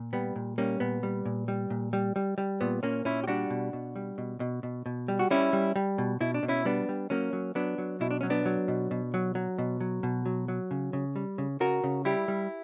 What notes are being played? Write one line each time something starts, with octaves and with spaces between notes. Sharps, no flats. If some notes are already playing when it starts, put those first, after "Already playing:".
Already playing: A#2
G3 B3
A#2
G3 A#3 C#4
A#2 B3
G3
A#2
G3
A#2
G3
G3
G3
A#2 B3
A#2 A#3 C#4
A#2 C#4 E4
G4
G3 D4 F#4
B2
B2
G3
B2
B2
B2
B2
G3
F#4
G3 C#4 E4
G3
G3
B2
B2 E4
D4
B2
C#4 E4
G3 B3 D4
G3
F#3 A#3 C#4
F#3
F#3 B3 D4
F#3
B2 E4
D4
F#3 C#4
B3 D4
F#3
B2
B2
F#3
F#3
B2
F#3
B2
F#3
F#3
C#3
C#3
G3
C#3
C#3 F#4 A#4
C#3
G3 E4 G4
G3